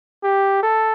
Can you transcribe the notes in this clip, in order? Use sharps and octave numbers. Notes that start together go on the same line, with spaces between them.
G4
A4